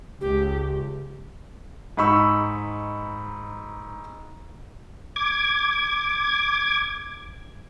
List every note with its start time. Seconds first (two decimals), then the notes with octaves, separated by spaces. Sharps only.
0.21 C#2 G4
1.97 G#2 D#4 B5 C#6 E6
5.16 D6 G#6